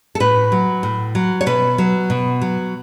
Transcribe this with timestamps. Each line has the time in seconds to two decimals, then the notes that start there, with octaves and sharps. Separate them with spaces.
0.15 A4
0.20 A2 B4
0.52 F#3
0.83 A2
1.15 F#3
1.41 C#5
1.46 B2 B4
1.78 F#3
2.10 B2
2.42 F#3